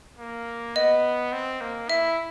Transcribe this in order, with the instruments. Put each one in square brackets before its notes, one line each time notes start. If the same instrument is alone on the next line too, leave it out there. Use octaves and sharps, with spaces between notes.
[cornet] A#3
[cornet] B3 [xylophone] D#5
[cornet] C4
A#3
[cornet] E4 [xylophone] E5